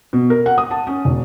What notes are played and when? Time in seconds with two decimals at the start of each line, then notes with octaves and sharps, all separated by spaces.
0.13 B2
0.30 A#4
0.46 F#5
0.58 D#6
0.71 A5
0.87 C#4
1.05 E1